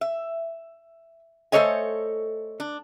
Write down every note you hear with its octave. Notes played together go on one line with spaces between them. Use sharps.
E5
A3 A4 C5 C#5 D#5 G#5
D4